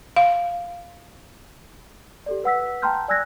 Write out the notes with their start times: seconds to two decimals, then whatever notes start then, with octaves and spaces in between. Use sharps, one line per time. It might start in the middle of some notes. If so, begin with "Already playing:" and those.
0.16 F5
2.26 G4 A4 D5
2.44 B4 F#5 E6 B6
2.82 G5 A5 A#5 C6 F6 G6
3.08 D5 G#5 E6 F#6 G#6 A#6